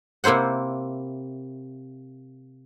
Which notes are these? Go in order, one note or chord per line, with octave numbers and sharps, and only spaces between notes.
C3 A#3 E4 C5 F#5